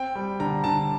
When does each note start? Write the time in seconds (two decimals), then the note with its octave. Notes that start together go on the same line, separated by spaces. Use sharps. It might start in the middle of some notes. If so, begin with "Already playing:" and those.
Already playing: C4 G5
0.15 G3
0.39 D3 A#5
0.64 D3 A5